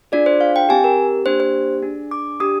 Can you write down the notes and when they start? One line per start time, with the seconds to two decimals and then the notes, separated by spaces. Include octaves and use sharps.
0.12 D4 F4 G#4 D5
0.26 C5
0.41 F5
0.56 G5
0.69 C4 G4 G#5
0.84 A#4
1.26 A#3 D4 G4 C5
1.40 C5
1.83 D4 G#4
2.11 D6
2.40 D4 G4 D#6